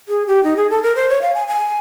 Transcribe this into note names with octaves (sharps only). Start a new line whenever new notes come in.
G#4
G4
D#4
G#4
A4
A#4
C5
C#5
F5
G#5
G#5